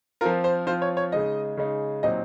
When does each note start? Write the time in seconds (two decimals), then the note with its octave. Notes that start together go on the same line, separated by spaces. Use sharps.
0.21 F3 C4 F4 A#4
0.44 C5
0.66 F3 C4 F4 C5
0.82 C#5
0.97 C#5
1.12 C#3 G#3 D#4 D#5
1.57 C#3 G#3 D#4
2.03 A#2 F#3 C4 D#4 D#5